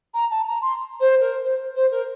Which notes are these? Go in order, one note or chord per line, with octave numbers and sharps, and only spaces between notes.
A#5
A5
A#5
C6
C5
A#4
C5
C5
A#4